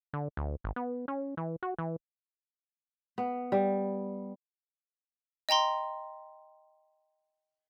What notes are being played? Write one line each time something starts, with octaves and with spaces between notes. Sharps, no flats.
D3
D2
G#1
B3
C#4
E3
F#4
E3
B3
G3
D#5 G5 A#5 C6